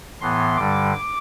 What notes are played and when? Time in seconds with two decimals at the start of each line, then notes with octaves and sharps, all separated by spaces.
0.20 A2 E3 B3 C6
0.57 G2 D3 G3 D6